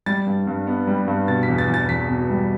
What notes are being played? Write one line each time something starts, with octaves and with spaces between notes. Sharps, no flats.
G3 A6
G2
G2
B3
G3
G2
B2 A6
B6
E2
A6
E2
A6
E2 B6
B2
G3